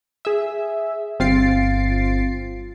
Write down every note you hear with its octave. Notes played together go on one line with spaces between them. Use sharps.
G#4 E5
G1 C4 F4 A6 C7 D7